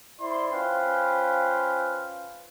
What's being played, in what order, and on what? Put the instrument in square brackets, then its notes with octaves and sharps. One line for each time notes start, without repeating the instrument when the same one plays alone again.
[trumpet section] E4 C5 D5 C6
C#4 F4 B4 C5 F5 G5